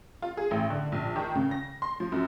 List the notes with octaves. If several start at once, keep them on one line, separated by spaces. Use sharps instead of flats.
F4
G#4
A1
D3
A#1
D#3
C#3
A#6
C6
F3
F#2